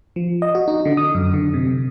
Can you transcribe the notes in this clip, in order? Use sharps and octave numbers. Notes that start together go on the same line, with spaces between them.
F3
D#5
F#4
D#4
D3
D#6
F#2
D3
C3